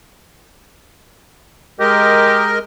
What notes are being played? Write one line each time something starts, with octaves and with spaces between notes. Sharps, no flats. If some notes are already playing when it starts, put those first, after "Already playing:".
G#3 G4 A#4 D#5